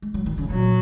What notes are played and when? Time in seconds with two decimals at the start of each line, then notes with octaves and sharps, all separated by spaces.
0.02 G#3
0.14 F#3
0.26 D#3
0.38 C#3
0.50 A#2 F#3